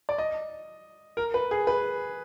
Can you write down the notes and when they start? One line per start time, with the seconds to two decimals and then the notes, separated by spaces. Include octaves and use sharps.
0.09 D5
0.18 D#5
1.17 A#4
1.34 B4
1.51 G#4
1.67 B4